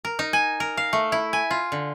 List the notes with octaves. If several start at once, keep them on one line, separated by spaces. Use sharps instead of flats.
A#4
D#4
G#5
A#4
F5
A3
E4
G#5
F4
D3